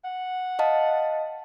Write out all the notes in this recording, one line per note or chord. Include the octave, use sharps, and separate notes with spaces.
F#5
D#5 F5 A5